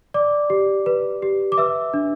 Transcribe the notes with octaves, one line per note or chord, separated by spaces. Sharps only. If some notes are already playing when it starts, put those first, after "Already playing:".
D5 D6
G4
B4
G4
D6
B4 E5 E6
D4